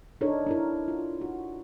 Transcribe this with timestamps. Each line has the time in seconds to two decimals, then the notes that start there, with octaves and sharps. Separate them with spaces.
0.21 D4 D#4 A4 A#4 C#5
0.47 D4 E4 A#4
0.88 F4
1.21 F#4